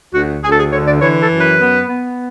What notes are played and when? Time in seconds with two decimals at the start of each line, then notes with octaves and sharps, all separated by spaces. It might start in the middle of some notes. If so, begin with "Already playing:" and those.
0.14 D2 F#4
0.44 D2 G#4
0.52 A4
0.58 G#4
0.72 D3 C#5
0.88 D5
1.01 E3 C#5
1.22 A4
1.31 F#2
1.41 B4
1.60 B3
1.89 B3